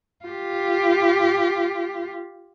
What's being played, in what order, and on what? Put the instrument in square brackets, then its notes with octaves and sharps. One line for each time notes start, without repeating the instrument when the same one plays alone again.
[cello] F4 G4